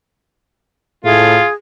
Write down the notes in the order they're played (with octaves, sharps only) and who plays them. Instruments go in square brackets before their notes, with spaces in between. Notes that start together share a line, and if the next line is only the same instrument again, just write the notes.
[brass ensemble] A2 A3 [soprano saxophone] F4 [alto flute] G#4